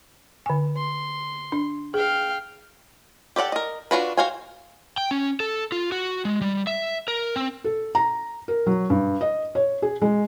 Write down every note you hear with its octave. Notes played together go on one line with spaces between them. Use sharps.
D3 G#5
C6
D4
G#4 F5 G5
G4 A4 D5 F#5
A#4 D#5
D4 F4 F#4 B4
F#4 C5 F5 G5 G#5
G5
C#4
A4
F4
F#4
G#3
G3
E5
A#4
C4
A4
A#5
A#4
F#3
G2
D#5
C#5
G#4
G#3